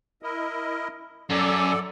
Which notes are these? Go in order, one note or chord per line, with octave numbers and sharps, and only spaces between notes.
E4 A#4 D#5
F#2 A4 D5